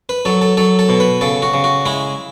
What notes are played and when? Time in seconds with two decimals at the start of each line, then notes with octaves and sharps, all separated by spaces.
0.09 B4
0.25 F#3 A4
0.41 A4
0.57 F#3 A4
0.79 A4
0.89 B2
1.00 B4
1.21 C#3 A4
1.42 F#4
1.54 C#3
1.64 F#4
1.86 G#3 E4